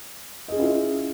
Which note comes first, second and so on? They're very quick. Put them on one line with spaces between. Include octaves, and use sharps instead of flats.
D#5 G#4 C#4 F4 E4